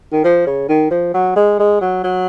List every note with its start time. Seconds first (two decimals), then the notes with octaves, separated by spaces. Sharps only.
0.12 D#3
0.24 F3
0.47 C#3
0.69 D#3
0.91 F3
1.14 F#3
1.36 G#3
1.59 G#3
1.81 F#3
2.04 F#3